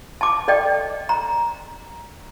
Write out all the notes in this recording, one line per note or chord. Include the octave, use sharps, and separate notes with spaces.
A5 D6
A4 D5 D#5 G5
A#5